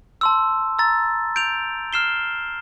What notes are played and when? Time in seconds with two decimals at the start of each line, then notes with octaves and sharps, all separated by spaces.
0.21 A5 C6 E6
0.79 A#5 E6 A6
1.36 G6 D7 F7
1.93 F6 C7 E7 G7